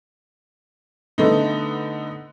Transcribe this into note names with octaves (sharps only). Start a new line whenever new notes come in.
D3 A3 B3 D#4